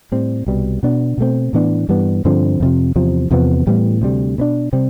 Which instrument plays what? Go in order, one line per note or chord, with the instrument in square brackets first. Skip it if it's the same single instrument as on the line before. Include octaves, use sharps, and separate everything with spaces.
[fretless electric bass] A2 G3 C4
C2 B2 G3
B2 B3 D4
B2 A3 C4
A2 E3 B3 D4
G2 E3 G3 B3
G2 D3 F3 C4
F2 C3 F3
E2 C3 F3
E2 C3 F3 B3
A2 E3 G3 B3
D2 C3 G3
B2 B3 D4
C3 G3 C4